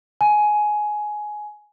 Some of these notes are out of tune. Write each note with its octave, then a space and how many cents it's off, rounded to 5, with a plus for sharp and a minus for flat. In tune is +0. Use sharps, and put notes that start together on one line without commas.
G#5 +15